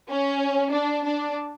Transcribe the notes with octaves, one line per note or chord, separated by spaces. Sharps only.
C#4
D4
D4